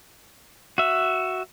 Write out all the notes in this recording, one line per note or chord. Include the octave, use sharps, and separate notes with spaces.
F#4 E5